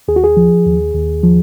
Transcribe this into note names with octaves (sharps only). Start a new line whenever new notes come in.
D#2 G#4
F#4
G#4
F3
D#2
D#2
F3